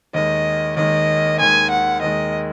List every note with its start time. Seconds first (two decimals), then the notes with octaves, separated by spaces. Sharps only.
0.14 D#2 D#3 G#3 D#5
0.77 D#2 D#3 G#3 D#5
1.39 D#2 D#3 G#3 G#5
1.70 F#5
2.02 D#2 D#3 G#3 D#5